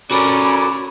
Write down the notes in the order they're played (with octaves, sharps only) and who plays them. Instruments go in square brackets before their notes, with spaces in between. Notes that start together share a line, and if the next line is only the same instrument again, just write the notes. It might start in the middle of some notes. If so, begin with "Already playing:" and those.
[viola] C#4 [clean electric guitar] F#4 A4 A#4 [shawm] D5 [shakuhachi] B5